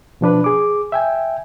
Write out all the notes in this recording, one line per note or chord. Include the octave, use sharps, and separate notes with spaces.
B2 F3 D4 B4
G#4 D6
E5 G5 G#5